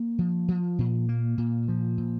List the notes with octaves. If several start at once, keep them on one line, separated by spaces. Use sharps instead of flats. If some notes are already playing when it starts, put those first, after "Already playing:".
Already playing: A#3
F3
F3
A#2
A#3
A#2
F3
A#2